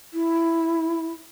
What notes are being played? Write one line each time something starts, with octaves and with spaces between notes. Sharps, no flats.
E4